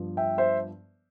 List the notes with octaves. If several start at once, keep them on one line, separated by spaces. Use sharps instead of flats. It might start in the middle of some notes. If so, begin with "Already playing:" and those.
Already playing: G2 F3 B3
E5 G5
C5 E5